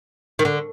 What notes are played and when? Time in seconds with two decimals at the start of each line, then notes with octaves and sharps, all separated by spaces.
0.39 D#3
0.45 D3